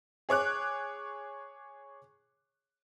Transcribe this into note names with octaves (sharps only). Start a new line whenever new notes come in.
G#4 C#5 D6 F#6